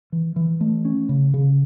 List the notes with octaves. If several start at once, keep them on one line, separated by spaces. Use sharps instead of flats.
E3
E3
A3
C#4
C#3
C#3